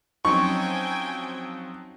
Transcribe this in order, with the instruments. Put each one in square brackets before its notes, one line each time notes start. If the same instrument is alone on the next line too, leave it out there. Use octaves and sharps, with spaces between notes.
[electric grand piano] F3 F#3 C4 [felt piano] C#4 D#4 [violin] G5 G#5 [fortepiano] C#6